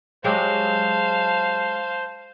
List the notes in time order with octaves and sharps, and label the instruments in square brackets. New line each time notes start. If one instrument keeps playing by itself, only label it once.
[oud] F#3 G#3 G4 [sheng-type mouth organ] C5 [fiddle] F5 A5